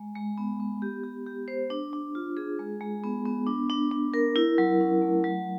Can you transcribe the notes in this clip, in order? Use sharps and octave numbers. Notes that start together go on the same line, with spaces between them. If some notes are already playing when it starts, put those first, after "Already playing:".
Already playing: G#3
G#3
B3
B3
G4
G4
G4
C5
D4
D4
F4
G#4
G#3
G#3
B3
B3
D4
D4
D4
A#4
E4
F#3
C#4
A3
F#3